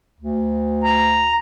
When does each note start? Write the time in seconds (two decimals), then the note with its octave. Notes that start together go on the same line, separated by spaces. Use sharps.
0.21 D2
0.84 A#5